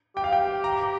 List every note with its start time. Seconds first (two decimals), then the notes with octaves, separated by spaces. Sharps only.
0.16 G4 G5
0.24 F5
0.33 G5
0.64 A#5